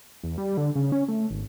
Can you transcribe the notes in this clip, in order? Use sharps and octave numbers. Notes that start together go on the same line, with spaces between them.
E2
G3
D3
C#3
C#4
A3
G#1